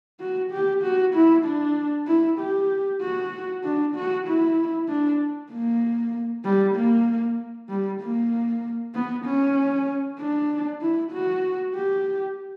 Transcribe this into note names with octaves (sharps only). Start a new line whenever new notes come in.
F#4
G4
F#4
E4
D4
E4
G4
F#4
D4
F#4
E4
D4
A#3
G3
A#3
G3
A#3
B3
C#4
D4
E4
F#4
G4